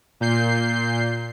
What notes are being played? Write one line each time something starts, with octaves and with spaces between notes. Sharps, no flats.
A#2 G6 C7